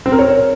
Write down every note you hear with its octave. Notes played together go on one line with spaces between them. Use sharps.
C4
A#4
C#5